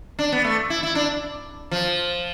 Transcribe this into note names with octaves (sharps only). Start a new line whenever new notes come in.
D4
B3
A3
E4
E4
D4
F3